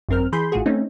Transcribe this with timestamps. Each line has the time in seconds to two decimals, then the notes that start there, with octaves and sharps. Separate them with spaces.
0.09 G#1 F#2 C4 A#4 F6
0.32 E3 G#4 B5 C6 G6
0.52 A1 A2 F4 F#4 G#4
0.66 A3 C4 C#4 D#4